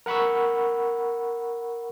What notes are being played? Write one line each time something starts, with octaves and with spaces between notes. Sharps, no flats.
A#4 F#5 B5 C#6 E6